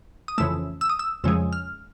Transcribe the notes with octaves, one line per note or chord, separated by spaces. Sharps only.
D#6
F2 C#3 E3 A3 E6
E6
D#6
E6
F2 C#3 F3 G#3 E6
F6